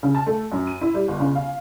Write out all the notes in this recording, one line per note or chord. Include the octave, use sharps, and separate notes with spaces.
C#3
A5
A3
F#2
D#7
E4
G3
G1
C#3
F5